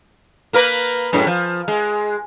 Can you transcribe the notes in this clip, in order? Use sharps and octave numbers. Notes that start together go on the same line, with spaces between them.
A#3 A#4 B4
F#2 A2 G#3
F3
G#3